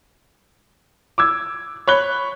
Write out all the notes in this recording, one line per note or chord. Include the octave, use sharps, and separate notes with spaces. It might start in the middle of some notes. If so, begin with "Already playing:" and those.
D6 E6 G#6
C#5 B5 F#6 G7